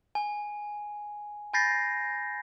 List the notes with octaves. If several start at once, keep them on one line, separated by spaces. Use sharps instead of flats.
G#5
G#5 B5 G6 A6 A#6 C7